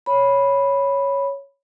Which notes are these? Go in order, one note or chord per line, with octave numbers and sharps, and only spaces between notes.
C#5 B5